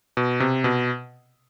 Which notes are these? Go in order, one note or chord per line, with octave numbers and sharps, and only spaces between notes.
B2
C3
B2